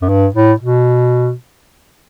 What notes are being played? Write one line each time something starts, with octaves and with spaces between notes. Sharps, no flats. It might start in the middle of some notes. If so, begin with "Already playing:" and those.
F#2
G2
A2
B2